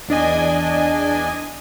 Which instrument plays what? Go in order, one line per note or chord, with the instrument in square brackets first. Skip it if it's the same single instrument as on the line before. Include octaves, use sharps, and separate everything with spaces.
[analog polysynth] E2 D4 D#5 G#5